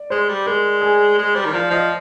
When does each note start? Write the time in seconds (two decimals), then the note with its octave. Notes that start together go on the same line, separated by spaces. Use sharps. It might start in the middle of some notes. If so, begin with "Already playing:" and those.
Already playing: D5
0.10 G#3 C5
0.29 G3
0.46 G#3 A#4
0.81 G#4
1.18 G#3
1.35 G3 C5
1.45 D#3
1.53 F3 D5
1.71 F3 D#5